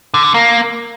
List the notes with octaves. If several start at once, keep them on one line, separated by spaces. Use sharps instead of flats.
D3
D3
A#3